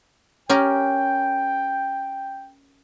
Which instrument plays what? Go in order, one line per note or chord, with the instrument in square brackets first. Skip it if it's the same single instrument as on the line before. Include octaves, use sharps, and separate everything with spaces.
[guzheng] C#4 G4 A#4 [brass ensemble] G5